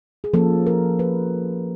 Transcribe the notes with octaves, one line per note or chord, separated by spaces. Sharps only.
G#4
F3 A#3 C#4 A4
A#4
B4